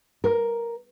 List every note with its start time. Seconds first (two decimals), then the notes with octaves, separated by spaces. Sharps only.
0.24 A#4